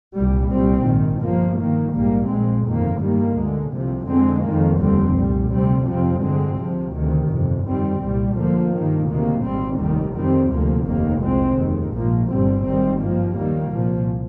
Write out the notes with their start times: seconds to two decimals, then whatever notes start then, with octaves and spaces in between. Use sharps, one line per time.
0.14 C2 A#2 G3
0.50 C2 A#2 G3 C4
0.85 A#1 G#2 D#3
1.21 G1 G2 F3 A#3
1.57 G2 D#3 A#3
1.93 A#1 G#2 G3 A#3
2.28 A#1 A#2 G#3 C4
2.64 G1 F2 D#3 A#3
3.00 G2 D#3 G3 A#3
3.35 D2 D3 G#3
3.71 C2 C3 F3
4.07 F2 D3 G#3 C4
4.43 F2 D#3 A#3
4.78 F1 D#2 D3 G3 C4
5.14 C2 A#2 G3
5.50 D2 C3 G3 C4
5.85 F2 C3 F3 C4
6.21 G2 D3 G#3 C4
6.57 C2 C3 F3
6.93 D2 C3 D#3
7.28 G1 F2 C3
7.63 F2 D#3 G3 C4
7.99 C2 A#2 G3
8.35 D2 D3 F3 A#3
8.71 G2 D#3 A#3
9.07 D2 C3 D#3 A#3
9.42 G#1 G#2 G3 C4
9.78 F1 D#2 D#3 G3
10.14 F2 D#3 G3 C4
10.50 D2 C3 F3 A#3
10.85 F1 D#2 D#3 A#3
11.21 C2 A#2 G#3 C4
11.57 F1 D#2 D#3
11.92 A#1 G#2 F3 A#3
12.28 G1 G2 D3 G3 C4
12.63 G#1 G#2 D#3 G3 C4
12.99 G2 F3 A#3
13.35 D#2 D#3 G3 A#3
13.70 C2 A#2 F3